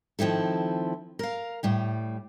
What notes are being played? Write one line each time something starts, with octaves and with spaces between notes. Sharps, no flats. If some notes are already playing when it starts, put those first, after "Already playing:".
D#3 F3 C4 E4 A4
A#4 F5
A2 G3 G4